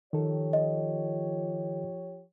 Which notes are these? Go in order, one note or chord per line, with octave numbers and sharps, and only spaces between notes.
D#3 F3 G4 A4 C#5
D#5